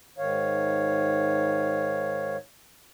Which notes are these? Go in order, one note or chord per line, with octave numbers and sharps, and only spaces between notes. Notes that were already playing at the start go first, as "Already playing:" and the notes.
G#2 D#3 C#5 F5